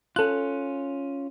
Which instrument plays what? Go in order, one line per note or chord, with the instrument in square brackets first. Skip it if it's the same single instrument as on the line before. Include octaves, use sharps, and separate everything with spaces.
[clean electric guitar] C#4 F4 [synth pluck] A4 F#6